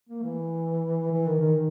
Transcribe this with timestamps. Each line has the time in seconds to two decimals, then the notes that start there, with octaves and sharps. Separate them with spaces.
0.09 A#3
0.23 E3
1.12 E3
1.27 D#3
1.40 D#3